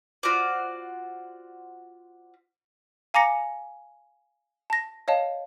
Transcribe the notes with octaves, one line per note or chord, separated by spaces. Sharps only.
F4 F#4 C5 D5
F5 G#5 A#5 D6 A#6 C#7
A5 A#6
C#5 D#5 F5 A5